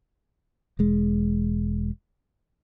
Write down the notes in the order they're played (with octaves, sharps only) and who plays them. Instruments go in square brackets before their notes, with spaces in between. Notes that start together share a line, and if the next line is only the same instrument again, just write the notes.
[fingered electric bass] E1 G#3